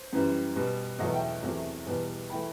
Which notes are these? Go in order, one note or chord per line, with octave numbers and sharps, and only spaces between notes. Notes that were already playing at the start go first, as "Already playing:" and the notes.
Already playing: C5
F#2 E3 G3
B2 G3
E2 B2 F#3 A3 D#5 F#5
E5 G5
E2 C3 F#3 A3
E2 B2 G3
E3 A3 G5 B5